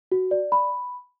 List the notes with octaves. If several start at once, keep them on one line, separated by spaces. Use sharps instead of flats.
F#4
D5
B5